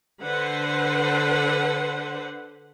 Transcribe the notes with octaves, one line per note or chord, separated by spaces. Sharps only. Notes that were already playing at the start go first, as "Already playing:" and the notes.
D3 B4 C5 F#5